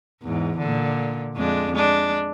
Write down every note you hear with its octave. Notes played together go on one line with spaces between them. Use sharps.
E2 G#2
A#2 D3
F2 G#3 D4
G#3 D4